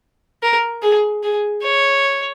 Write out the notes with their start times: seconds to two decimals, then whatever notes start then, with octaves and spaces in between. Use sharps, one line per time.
0.42 A#4
0.82 G#4
1.23 G#4
1.63 C#5